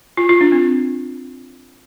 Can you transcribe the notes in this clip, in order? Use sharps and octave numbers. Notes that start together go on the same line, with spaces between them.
F4
F4
D4
C4